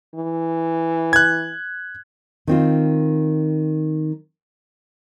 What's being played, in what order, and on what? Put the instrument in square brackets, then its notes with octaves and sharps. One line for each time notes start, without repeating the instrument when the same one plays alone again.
[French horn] E3
[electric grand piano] F#6 G#6
[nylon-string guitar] D#3 C4 F4